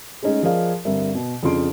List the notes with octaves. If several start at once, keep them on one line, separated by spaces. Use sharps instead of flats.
G#3 A3 C#4 D#4 G#4
F3 G#4 A#4 D5 D#5 F5
G2 D3 C4 A#4 E5
B2
F2 C#3 D4 F4 C6 D7